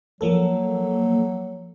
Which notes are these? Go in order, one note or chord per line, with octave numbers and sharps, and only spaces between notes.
F3 F#3 A#3 A4